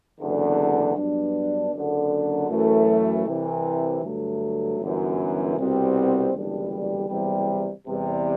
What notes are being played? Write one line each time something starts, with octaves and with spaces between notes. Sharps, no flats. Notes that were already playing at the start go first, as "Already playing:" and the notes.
F#1 E2 D3
G2 F#3 B3 D4
F#1 F#2 D3
F#2 E3 A3
C2 C3 E3
G2 D3 F#3 A3
G1 F#2 E3
C2 B2 G3 C4 F#4
F#1 E2 D3 G3 D4
F#1 E2 C3 G3
E2 C3 G3